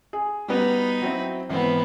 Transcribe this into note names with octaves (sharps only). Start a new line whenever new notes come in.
G#4
G3 B3 D#4 F#4 B5
F#3 C4 E4
G#1 E3 B3 C4